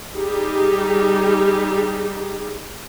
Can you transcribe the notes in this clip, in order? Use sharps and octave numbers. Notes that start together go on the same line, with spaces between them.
G3 D#4 G4 G#4